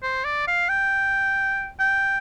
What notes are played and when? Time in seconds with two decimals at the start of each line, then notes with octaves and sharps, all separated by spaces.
0.02 C5
0.24 D5
0.47 F5
0.69 G5
1.79 G5